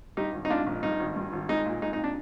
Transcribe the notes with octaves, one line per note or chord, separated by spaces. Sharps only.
G2 D#4 G4
G#1
D#4
G#2 D4 F4
A#1
G2 D#4
G#1
G2
G#1
G#3 D#4
A#2
G#3 D#4
D#4
A#2
D4